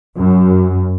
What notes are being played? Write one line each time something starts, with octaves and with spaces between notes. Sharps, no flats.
F#2